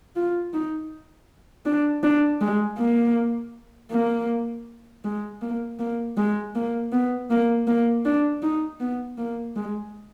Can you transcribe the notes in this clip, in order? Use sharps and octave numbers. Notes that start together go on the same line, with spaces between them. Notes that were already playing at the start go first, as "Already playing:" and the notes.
F4
D#4
D4
D4
G#3
A#3
A#3
G#3
A#3
A#3
G#3
A#3
B3
A#3
A#3
D4
D#4
B3
A#3
G#3